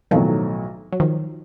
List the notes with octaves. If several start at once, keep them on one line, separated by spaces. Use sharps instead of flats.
B1 A2 D#3 F3 F#3
F#3
D#3 F3